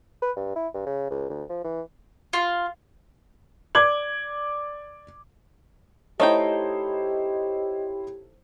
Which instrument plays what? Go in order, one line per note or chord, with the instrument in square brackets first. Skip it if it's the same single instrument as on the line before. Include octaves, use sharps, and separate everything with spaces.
[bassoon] B4
G2
E4
G2
C#3
C#2
D2
F3
E3
[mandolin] F4
[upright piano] D5 D6 G#6 F#7
[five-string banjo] A3 D#4 G5 [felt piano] E4 C5 C#5 [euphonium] G4 [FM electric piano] D#5